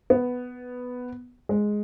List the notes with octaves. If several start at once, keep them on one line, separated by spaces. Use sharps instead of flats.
B3
G#3